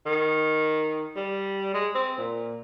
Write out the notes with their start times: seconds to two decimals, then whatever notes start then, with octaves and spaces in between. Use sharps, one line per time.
0.06 D#3
1.15 G3
1.74 G#3
1.95 C4
2.18 A#2